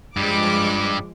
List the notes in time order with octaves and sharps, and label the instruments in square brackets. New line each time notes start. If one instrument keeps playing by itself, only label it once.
[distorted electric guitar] G2 G3 [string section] F3 G#3 D6